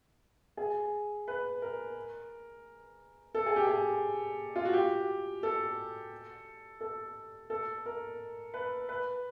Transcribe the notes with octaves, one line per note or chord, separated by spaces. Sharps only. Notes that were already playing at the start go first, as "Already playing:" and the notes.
G#4
B4
A#4
A4
G#4
G4
G#4
F4
F#4
G4
A4
A4
A4
A#4
B4
B4